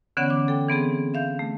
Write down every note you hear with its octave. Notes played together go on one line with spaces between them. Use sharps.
D3 E3 B3 C#4 C#5 F#5
D6
A4 G5
E3 B3 C4 G#4
E5 F5 G6
A3